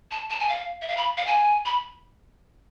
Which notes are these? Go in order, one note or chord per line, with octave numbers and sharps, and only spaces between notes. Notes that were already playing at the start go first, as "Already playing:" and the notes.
A5
A5
G#5
F5
E5
F5
B5
F5
G#5
B5